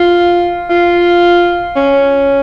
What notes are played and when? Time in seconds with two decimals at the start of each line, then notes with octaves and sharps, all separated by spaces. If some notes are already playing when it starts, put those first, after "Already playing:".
Already playing: F4
0.70 F4
1.76 C#4